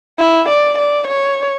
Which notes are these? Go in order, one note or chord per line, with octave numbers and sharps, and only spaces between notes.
E4
D5
D5
C#5